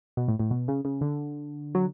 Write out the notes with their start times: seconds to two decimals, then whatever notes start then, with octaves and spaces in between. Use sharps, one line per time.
0.17 B2
0.28 A2
0.40 A2
0.51 B2
0.68 C#3
0.85 C#3
1.01 D3
1.75 F#3